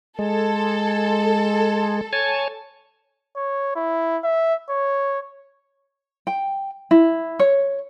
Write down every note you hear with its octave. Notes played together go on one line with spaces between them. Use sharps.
G#3 A4
C#5 G#5 A5
C#5
E4
E5
C#5
G5
E4
C#5